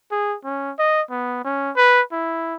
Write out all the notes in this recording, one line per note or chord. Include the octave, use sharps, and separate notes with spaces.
G#4
C#4
D#5
B3
C#4
B4
E4